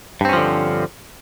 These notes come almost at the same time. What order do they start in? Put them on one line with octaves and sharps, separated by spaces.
G2 C4 C#4 F3 D3